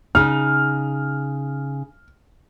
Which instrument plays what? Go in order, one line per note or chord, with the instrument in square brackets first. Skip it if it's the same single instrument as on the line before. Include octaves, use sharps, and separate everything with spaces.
[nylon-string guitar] C#3 D#4 [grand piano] F6